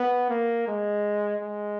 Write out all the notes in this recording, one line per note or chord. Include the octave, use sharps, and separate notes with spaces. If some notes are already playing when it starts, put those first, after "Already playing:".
Already playing: B3
A#3
G#3
G#3